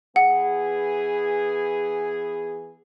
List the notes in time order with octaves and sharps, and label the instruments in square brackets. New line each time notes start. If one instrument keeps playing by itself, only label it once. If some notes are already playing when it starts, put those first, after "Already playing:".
[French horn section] E3 B3 G#4 [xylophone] F#5